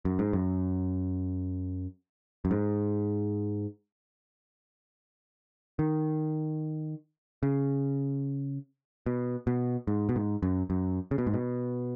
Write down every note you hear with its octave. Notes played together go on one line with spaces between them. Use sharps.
F#2
G#2
F#2
F#2
G#2
D#3
C#3
B2
B2
G#2
B2
G#2
F#2
F#2
C#3
B2
G#2
B2